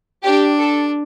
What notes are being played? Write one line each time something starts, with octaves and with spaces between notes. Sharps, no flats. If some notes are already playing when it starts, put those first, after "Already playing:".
D4 G4
A4